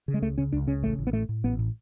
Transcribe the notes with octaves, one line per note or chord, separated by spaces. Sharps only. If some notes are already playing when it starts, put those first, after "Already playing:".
C#3
G#3
C#2 A3
C#3 C#4
C#2 D4
C#3 C#4
A1 A3
A1
B3
A2 A3
A2
A1 B3
A2